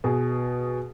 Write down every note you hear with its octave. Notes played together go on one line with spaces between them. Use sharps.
B2 G#4